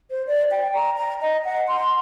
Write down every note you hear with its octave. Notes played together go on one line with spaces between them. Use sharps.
C5
D5
G5
A#5
A#5
D#5
F#5
C6